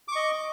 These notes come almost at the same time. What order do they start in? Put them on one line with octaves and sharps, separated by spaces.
D6 C#6 D#5